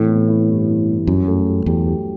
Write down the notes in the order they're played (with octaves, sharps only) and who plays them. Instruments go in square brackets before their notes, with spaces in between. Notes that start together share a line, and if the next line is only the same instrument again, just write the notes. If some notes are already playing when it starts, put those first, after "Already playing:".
Already playing: [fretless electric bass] A2 [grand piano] E3 C4
[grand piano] B3
E4
G2
E4
G2
[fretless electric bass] F#2 [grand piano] F#3
[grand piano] A3
G4
[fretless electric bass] E2 [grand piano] G4
[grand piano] G4